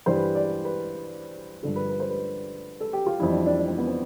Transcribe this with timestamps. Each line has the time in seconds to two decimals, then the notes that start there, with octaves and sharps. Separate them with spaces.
0.06 G2 E3 G3 C5
0.16 B4
0.35 D5
0.65 B4
1.62 G2 D3 F3 A4
1.76 B4
1.89 B4
2.00 C5
2.10 B4
2.80 A4
2.93 G4
3.06 F4
3.20 F2 E3 G3 E4
3.32 D4
3.46 D4
3.58 D4
3.68 C4
3.78 B3
3.87 C4